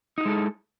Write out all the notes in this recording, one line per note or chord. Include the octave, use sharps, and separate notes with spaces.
G#3 D#4 E4 F#4 A4